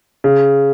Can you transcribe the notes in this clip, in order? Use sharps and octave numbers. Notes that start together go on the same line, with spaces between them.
C#3